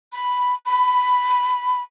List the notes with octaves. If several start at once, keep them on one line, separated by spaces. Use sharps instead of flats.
B5
B5